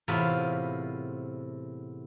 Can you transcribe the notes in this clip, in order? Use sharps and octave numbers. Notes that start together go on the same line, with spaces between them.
E2 A2 C3 F4 B5